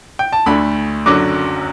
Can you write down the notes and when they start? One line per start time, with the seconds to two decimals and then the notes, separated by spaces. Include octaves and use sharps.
0.19 G5
0.32 A5
0.46 D2 D3 A3 B5
1.06 F#1 F#2 D3 F#3 D6